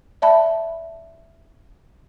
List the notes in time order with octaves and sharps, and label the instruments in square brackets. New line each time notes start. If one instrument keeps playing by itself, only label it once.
[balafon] D5 E5 A5 B5